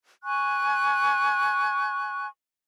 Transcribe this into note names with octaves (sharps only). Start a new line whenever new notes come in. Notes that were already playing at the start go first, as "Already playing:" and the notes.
G#5 C#6 F#6